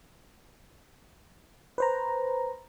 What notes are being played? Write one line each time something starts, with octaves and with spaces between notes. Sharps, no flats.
B4 C5 A#5